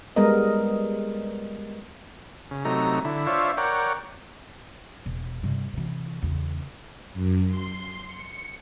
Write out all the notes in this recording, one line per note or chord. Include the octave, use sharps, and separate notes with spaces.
G3 G#3 B3 A#4 D#5
C#3
C3 F#3 A3 D#4 A#5
D3 E4
D4 F4 C5 C#5 E5
A#4 C#5 D5 F#5 G5
E1 B2
G2 C3
C3 E3
E2 C#3
F#2
C6
C#7